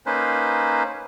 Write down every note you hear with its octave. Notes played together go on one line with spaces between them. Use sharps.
A#3 C#4 D#4 B4 C5